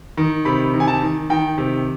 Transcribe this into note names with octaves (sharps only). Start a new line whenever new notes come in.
D#3
C3 B5
D#3
G#5
A5
D#3
D#3 G5
C3